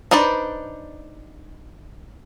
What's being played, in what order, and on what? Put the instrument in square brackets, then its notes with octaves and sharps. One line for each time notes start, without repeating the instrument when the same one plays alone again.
[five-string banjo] D4 D#4 B4 C5 D5